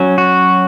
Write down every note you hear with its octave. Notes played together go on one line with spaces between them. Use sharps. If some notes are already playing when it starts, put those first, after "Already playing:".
Already playing: F#3 C#4
F#4